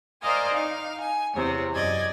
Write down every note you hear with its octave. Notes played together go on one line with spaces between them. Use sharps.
A#4 C5 D5 D#5 F5 G#5
D#4 F5
G#5
E2 C3 C#5
F#2 D5 D#5 G#6